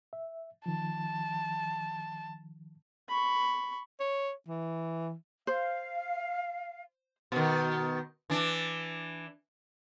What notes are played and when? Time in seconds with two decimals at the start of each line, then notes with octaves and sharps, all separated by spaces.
0.13 E5
0.66 D#3 F3 A5
3.08 B5 C#6
4.00 C#5
4.48 E3
5.47 C5 F5
7.32 B2 D#3
8.30 E3 D4